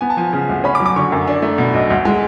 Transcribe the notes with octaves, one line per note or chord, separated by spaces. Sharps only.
B3 G#5
A5
F3 G#5
C#3
D2
C#4 B5
D6
F#3
D6
D3 C#6
F#2
D4
A3
B2
B1
D2
G#3